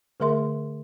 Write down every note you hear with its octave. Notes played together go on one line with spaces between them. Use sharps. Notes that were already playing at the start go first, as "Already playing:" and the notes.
D3 A3 G#4 A#4 E5 C6